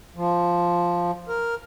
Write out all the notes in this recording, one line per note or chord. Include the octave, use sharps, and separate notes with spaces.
F3
A#4